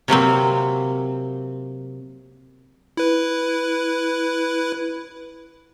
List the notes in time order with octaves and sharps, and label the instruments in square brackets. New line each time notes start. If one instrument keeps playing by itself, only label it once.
[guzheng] C3 F#3 A#3 C4
[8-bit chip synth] E4 B4